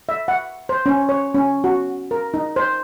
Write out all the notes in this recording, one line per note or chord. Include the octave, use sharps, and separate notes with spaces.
E5
F#5
C5
C#4
C#5
C#4
F#4
A#4
D#4
C5